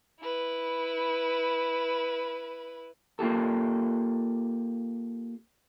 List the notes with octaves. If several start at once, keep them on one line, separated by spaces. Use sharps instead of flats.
E4 B4
A#3 F4 G4 A4